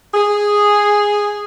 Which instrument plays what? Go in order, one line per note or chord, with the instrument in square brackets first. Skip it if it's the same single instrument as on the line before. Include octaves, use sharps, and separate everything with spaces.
[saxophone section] G#4